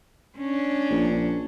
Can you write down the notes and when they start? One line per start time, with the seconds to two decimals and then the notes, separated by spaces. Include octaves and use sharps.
0.38 C#4 D4
0.90 A#1